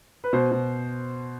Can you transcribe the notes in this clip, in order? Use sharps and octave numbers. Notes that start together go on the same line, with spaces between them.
B4
B2 C5
B2